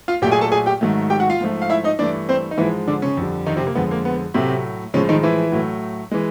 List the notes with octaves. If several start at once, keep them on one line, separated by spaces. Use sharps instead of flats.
F4 F5
A#2 F#3 A3 G4 G5
G#4 G#5
A4 A5
G#4 G#5
G4 G5
G#2 D#3 F#3 A3
G4 G5
F#4 F#5
F4 F5
G#2 F3 A3
F5
E4 E5
D#4 D#5
G2 E3 A3 D4 D5
C4 C5
D#4
G#2 E3 F3 G#3 E4
D3 D4
C#3 C#4
F2 D3 G3
D#3 D#4
C3 C4
A#3
F2 D3 F3 G#3 B3
A#3
B3
A2 C3 F#3 A3 C4
A2 C#3 F3 G#3 C#4
D#3 D#4
E3 E4
A2 F#3 A3
E3 G#3